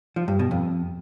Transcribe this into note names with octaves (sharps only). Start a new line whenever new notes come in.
F3
G2
B2
F2